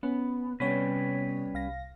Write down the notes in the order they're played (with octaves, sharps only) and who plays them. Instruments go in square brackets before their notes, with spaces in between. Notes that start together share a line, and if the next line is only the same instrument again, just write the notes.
[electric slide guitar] B3 [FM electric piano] C#4
[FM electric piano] C3 B3 C#5 [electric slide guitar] G3 C#4 B4
[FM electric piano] C2 F5 A#6